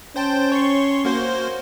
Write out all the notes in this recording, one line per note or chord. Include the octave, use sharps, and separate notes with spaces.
C#4 C5 G5 A5
C#5 C6 C#6
A#3 F#4 C5